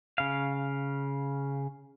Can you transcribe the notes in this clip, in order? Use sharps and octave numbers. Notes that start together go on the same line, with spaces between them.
C#3 F5